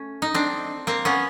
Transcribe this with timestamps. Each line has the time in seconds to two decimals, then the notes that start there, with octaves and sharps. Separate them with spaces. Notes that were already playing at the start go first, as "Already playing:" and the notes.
Already playing: A3 C#4
0.22 D#4
0.34 C4 D4
0.87 A#3 C4
1.05 B3 C#4